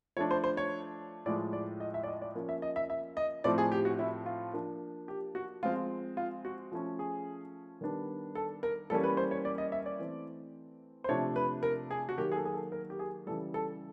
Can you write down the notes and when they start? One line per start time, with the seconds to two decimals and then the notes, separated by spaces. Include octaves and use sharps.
0.17 F3 A3 D4 C#5
0.31 C5
0.44 C5
0.57 C#5
1.26 A2 F3 G#3 D5
1.53 D5
1.80 D#5
1.94 E5
2.03 D5
2.08 D#5
2.22 D5
2.35 F3 A#3 C#4
2.49 E5
2.62 D#5
2.76 E5
2.90 E5
3.17 D#5
3.44 A2 F3 A3 C4 D5
3.58 G#4
3.72 G4
3.85 F#4
3.99 E4
4.26 F4
4.53 F3 A#3 D4
5.08 G4
5.35 F#4
5.63 F3 G#3 C4 F4
6.17 F4
6.45 F#4
6.72 F3 A3 C#4
6.99 G#4
7.81 D#3 G3 B3 D4
8.35 A4
8.63 A#4
8.90 E3 G3 A#3 C#4 A4
9.04 B4
9.17 C5
9.31 C#5
9.45 D5
9.58 D#5
9.72 E5
9.86 D5
9.99 E3 A3 C4
11.04 C5
11.09 C3 F3 A3 D4 C#5
11.36 B4
11.63 A#4
11.91 G#4
12.09 F#4
12.18 D#3 F#3 A#3 G4
12.32 G#4
12.36 A4
12.46 G#4
12.54 A4
12.72 A#4
12.90 G4
12.99 G#4
13.27 C#3 E3 G3 A4
13.54 A4